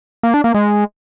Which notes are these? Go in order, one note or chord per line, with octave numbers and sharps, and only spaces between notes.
A#3
D4
A#3
G#3